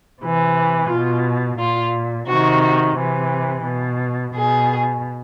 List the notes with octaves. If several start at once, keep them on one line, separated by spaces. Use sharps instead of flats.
C3 E3
B2 F4
A#2 F4
C3 D#3 F#4
C3 E3
B2
B2 G#4